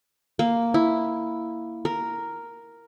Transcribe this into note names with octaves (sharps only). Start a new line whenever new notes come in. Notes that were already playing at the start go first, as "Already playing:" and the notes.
A#3
E4
A#4